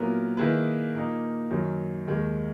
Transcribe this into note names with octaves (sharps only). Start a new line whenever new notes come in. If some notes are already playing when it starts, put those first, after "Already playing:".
Already playing: A#2 F#3 B3 E4 A#4
D#3 A#3 E4 G#4 B4
A#2 A#3 D#4
F#2 D#3 F#3
D#2 D#3 G#3